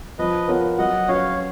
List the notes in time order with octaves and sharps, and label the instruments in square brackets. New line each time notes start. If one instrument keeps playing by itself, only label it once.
[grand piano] F3 [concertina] B4 D#5
[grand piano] B3 F4 A#4 C#5
[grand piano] F#3 [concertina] D#5 F#5
[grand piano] C#4 F#4 B4 [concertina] C#5 F5